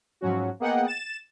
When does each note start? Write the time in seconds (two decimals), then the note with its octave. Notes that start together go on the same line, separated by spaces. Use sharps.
0.21 G#2 F3 F#3 C#4 F#4
0.60 A#3 B3 G#4 D#5 F#5 G5
0.87 A6 E7